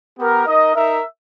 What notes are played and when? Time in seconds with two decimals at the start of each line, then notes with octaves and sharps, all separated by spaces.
0.18 B3 G4 A#4
0.46 D#4 A#4 D#5
0.74 D#4 A#4 E5